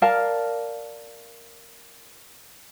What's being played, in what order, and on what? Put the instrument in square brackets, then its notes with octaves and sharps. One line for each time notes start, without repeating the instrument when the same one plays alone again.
[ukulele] A#4 D5 F5 A5